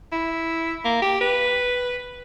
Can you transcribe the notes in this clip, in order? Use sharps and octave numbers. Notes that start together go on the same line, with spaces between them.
E4
A#3
G4
B4